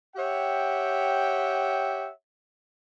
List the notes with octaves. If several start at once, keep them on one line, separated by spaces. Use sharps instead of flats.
G4 C#5 E5 F#5 G5